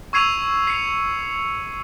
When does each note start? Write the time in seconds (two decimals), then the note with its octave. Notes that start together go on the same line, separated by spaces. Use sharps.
0.13 C#6 E6 G#6 C7 D#7 F7
0.67 C7 C#7 F7